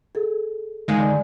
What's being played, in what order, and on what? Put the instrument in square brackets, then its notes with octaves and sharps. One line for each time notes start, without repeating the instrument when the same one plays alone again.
[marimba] G#4 A4
[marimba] D3 F5 G#5 [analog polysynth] D#3 G#3
[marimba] D5